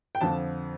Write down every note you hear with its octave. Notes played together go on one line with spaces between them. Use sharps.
G5
F2 D3 F3 A5